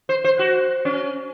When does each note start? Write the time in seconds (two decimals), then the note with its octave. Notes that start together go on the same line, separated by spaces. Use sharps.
0.09 C5
0.24 C5
0.39 F#4
0.85 C#4